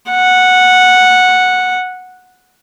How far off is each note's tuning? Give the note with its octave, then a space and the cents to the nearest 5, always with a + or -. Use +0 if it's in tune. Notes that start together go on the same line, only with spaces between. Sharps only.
F#5 -10